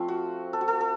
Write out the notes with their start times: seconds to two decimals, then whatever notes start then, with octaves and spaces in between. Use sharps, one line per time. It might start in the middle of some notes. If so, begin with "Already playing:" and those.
Already playing: F3 A3 C4 F4
0.08 F#4
0.53 A4
0.61 F#4
0.68 A4
0.81 A4